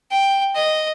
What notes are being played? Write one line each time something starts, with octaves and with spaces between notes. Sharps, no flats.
G5
D#5